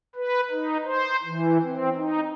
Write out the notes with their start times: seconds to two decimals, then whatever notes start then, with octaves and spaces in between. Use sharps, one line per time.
0.16 B4
0.50 D#4
0.85 C5
1.23 E3
1.63 C4
1.96 D#4